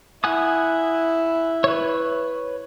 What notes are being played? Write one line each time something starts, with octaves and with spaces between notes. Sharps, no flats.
E4 F#5 G#5 D#6
B4 C#5